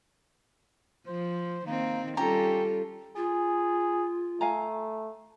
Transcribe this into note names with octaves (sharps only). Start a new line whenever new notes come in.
F3 C5
D#3 A#3 C4
G3 C#4 F4 G4 A4 A#5
F4 G#4
A3 F5 G#5 A#5